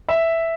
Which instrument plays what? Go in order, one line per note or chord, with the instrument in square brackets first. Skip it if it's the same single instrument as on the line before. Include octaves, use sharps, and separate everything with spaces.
[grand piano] E5